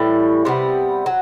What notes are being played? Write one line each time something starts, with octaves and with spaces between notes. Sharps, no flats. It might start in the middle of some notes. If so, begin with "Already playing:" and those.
Already playing: A2 E3 G3
C3 G3 B3
F#3